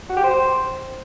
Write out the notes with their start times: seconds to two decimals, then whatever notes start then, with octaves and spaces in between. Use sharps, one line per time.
0.10 F#4
0.17 G4
0.24 C5